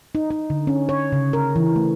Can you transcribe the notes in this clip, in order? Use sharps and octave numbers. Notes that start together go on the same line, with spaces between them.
D#4
D#4
D3
C#4
C#5
C#3
A#4
E3
A3